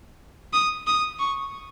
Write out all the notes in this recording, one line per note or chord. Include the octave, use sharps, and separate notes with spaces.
D#6
D#6
C#6